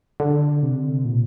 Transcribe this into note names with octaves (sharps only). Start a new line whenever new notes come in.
D3
C3
A#2